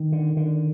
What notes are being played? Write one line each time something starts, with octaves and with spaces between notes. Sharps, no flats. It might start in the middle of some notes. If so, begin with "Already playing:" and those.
Already playing: D#3
D3
D3